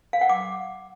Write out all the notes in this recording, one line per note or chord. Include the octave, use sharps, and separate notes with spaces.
F5
F#5
D6